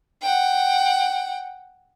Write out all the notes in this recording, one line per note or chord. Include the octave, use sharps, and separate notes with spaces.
F#5 G5